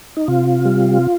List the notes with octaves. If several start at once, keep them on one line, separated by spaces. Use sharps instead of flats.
D#4
C3 F4
G3